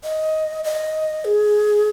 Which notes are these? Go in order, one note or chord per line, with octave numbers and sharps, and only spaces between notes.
D#5
D#5
G#4